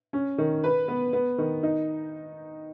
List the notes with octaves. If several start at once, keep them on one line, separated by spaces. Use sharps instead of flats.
C#4
D#3
B4
B3
B3
D#3
D#4